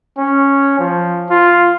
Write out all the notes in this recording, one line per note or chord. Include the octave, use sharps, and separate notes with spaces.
C#4
F3
F4